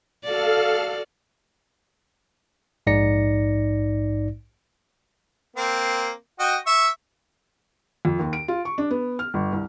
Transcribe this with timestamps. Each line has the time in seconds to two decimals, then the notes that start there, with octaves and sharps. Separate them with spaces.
0.24 F#4 A4 D5 F5 F6
2.87 A#1 G#2 D#4 D5 A#6 C#7
5.56 A#3 C4
6.39 F#4 D#5 G5
6.66 E5 C#6
8.05 F2
8.19 D#2
8.33 D7
8.48 F4
8.65 C#6
8.78 D4
8.90 B3
9.19 F6
9.34 G1
9.53 C2